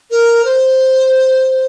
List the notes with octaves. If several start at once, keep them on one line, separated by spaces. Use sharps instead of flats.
A#4
C5